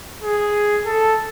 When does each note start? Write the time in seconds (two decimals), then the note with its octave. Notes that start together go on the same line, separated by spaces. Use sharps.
0.23 G#4
0.86 A4